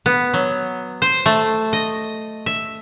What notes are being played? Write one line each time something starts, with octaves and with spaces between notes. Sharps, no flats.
B3
F#3
C5
A3
D#5
E5